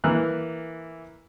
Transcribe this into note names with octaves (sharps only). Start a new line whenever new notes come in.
E3 A#3 F6 F#6